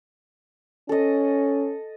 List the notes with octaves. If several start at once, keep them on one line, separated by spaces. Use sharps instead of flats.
C#4 A4 D#5